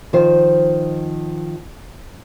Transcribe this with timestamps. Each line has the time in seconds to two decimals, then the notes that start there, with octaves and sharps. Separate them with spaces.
0.13 D#3 F3 F4 C5